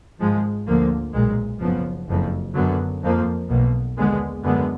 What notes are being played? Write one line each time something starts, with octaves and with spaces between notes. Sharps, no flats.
G#1 G#2 F3 G#3
D2 D3 F3 A#3
B1 A#2 G#3
F#1 F#2 F3 B3
F#1 F2 F3
F#2 D3 F#3 B3
F2 F3 A#3
B1 B2 A#3
D#2 D3 G#3 B3
F#2 D3 G#3 B3